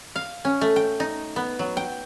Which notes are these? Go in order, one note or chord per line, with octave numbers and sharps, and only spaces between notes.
F5
C#4
A3
G5
D#4
B3
F#3
G5